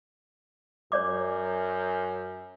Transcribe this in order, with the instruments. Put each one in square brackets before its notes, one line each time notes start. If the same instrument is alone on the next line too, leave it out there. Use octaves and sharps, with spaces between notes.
[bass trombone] F#2 [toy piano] C#5 D5 D6